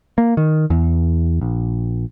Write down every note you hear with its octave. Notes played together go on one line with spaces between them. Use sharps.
A#3
D#3
E2
A#1